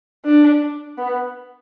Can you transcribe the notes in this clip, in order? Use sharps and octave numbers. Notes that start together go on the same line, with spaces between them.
D4
B3